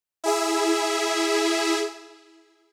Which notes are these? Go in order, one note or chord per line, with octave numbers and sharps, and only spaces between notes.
E4 G#4 E5